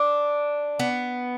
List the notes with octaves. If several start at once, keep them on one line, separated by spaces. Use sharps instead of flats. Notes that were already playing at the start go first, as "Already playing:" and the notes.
Already playing: D4
B3